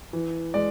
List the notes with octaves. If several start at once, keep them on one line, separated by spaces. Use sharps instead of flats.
E3
G#3 D5